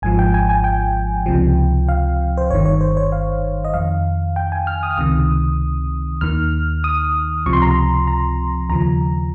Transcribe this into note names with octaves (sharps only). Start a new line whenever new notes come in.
G#1 G#2 F3 G#5
G5
G#5
G#5
G5
C#2 C3 F3
F5
C5
G1 G2 D#3 C#5
C#5
C5
C#5
F5
D#5
F2 D#3 F5
G5
G#5
F6
D#6
F6
C#2 C3 D#3 D#6
D#2 D#3 F6
D#6
C#2 C3 F3 C#6
C6
A#5
C6
A#5
D#2 C#3 F3 A#5